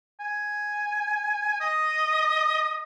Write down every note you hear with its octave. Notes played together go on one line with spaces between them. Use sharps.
G#5
D#5